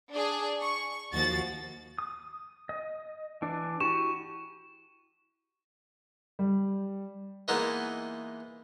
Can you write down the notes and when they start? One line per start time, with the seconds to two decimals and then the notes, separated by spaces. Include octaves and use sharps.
0.12 D4 G#4
0.61 C#6
1.13 D#2 F3 F#4 A6
1.98 D#6
2.69 D#5
3.42 E3 D4 D5
3.80 E4 F#4 G4 C#6 E7
6.39 G3
7.48 E3 G#3 A#3 B3 D#4 E4